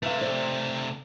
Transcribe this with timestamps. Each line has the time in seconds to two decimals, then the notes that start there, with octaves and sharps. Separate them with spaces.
0.03 C3 A3 B4 F5
0.21 C5 D5